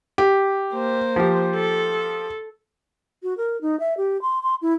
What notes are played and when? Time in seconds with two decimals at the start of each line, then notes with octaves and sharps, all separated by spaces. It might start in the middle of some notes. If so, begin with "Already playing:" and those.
0.18 G4
0.73 A#3 C5
1.16 F3 G4
1.56 A4
3.23 F#4
3.37 A#4
3.61 D#4
3.80 E5
3.97 G4
4.22 C6
4.43 C6
4.62 E4